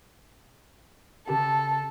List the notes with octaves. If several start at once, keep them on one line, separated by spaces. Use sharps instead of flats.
C#3 G4 A4 A5